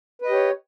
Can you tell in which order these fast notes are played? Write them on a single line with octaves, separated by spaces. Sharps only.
B4 D#5 G4 C#5